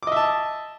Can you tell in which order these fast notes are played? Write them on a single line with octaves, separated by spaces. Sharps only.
D6 D#5 E5 A5